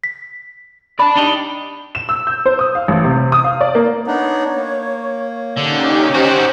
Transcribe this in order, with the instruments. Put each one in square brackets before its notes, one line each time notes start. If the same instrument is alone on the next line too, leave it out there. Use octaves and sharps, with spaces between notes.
[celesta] B6
[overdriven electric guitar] D5 A5 [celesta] B5
[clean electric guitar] D4 D#4 G4
[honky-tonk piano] E7
E6
G6
C5
D#6
F5
A1
C3
D#6
F5
D5
A#3
[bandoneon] B3 D4 D#4 [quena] C#5
[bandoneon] A#3
[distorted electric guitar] D3 [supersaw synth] C#4 D#4 G4
[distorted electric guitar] C4 F#4 [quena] C5